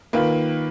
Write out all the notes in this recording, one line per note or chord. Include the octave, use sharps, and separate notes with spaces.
D#3 A#3 F4 B4